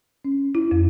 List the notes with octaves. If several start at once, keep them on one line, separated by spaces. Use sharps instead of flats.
C#4
E4
F2